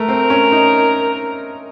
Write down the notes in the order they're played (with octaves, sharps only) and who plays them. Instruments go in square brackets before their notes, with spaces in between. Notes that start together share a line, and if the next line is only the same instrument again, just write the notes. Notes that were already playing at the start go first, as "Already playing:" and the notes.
Already playing: [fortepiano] A3 [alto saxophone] A#4
[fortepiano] C4
C#4
D#4